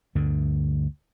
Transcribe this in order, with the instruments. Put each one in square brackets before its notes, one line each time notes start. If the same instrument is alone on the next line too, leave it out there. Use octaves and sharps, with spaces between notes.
[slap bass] D2 G2 D3